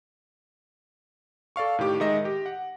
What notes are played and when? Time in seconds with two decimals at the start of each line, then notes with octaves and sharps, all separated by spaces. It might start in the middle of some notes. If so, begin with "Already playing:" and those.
1.56 A4 D5 F5 C#6
1.79 A2 D#3 G4 D6
2.00 D#3 G#3 D#5 E5 A#6
2.25 G4
2.46 F#5